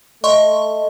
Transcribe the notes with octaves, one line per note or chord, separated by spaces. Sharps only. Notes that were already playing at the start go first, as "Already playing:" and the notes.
A3 D#5 C6 C#6